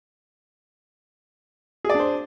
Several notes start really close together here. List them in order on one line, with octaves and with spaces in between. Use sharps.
G#4 D5 D4 C5